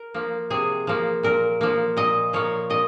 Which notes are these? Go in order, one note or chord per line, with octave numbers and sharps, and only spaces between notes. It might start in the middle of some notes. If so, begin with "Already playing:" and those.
Already playing: A#4
F3 A#3
C3 G#4
F3 A#3
A#2 A#4
F3 A#3
A#2 D#5
F3 A#3 C#5
A#2 D#5